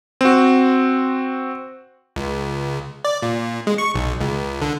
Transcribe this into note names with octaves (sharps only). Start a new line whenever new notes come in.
C4 F#4
C#2
D5
A#2
G#3
C#6
B1
C#2
D3